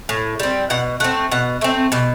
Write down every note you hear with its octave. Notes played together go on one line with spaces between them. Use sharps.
A2
G3 C4
B2 F#5
A3 C4 F#5
B2 F#5
A3 C4 E5
B2 G4